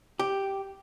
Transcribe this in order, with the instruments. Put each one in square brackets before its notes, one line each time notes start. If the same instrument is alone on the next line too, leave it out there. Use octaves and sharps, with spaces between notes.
[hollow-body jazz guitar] G4